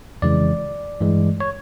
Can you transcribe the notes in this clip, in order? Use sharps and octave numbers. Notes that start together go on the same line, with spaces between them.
F2 C#3 E3 G#3 D5
G2 E3 G#3
C#5